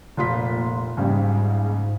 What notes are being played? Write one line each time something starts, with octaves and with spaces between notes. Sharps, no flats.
F1 A#2 F4 B6
A#1 G#2 C#3 G3